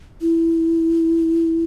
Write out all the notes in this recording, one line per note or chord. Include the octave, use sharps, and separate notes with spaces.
E4